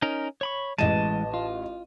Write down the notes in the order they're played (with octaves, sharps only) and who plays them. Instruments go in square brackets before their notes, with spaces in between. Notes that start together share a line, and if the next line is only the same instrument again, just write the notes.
[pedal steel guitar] C#4 D#4 A#4
C#5 B5 C#6
[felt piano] A1 D#5 D#7 [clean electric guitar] E3 G#3 [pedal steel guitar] A5
[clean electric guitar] F4